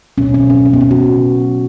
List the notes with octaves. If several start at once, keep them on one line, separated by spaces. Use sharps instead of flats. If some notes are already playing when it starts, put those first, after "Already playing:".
B2 F#3 C#4
C#4
C#4
C#4
B3
C#4
F#4
C#3 F#3